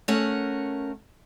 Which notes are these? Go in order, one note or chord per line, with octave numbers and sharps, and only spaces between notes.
A3 C#4 A#4 F#5